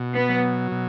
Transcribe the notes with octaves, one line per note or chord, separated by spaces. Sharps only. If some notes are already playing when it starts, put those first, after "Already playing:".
Already playing: B2
B3
F#3
B2